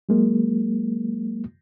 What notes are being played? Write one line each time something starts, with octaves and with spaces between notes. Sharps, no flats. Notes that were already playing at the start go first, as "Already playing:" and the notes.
F#3 G#3 A#3